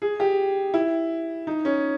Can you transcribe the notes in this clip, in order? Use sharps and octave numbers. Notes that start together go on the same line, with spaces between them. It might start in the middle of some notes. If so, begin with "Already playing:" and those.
G#4
G4
E4
D#4
C#4